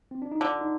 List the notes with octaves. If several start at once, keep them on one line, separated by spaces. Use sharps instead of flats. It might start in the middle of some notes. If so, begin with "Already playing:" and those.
C4
D4
D#4
D3 F4
D#4